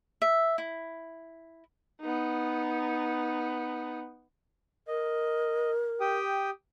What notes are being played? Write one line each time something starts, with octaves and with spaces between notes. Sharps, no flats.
E5
E4
B3 D#4
A#4 D#5
G4 G5 D#6